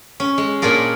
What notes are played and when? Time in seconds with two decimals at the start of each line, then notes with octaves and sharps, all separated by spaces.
0.20 C#4
0.38 G#3
0.62 A#2 D4 F4 G#4 A#4